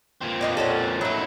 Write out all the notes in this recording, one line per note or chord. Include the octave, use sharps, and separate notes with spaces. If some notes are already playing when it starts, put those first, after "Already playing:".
A#2 C4
D4 D#4 F4
C#4 F#4 A4
F#3 A3 D#4 E4